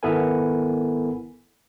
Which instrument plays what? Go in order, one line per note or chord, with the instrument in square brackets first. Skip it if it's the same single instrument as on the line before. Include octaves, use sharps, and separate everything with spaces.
[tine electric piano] G#1 B3 E4 A4 A#4 G#5